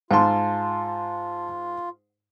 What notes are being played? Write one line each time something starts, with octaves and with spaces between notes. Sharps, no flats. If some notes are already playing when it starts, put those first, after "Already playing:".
G#2 F4 F5 A5 C6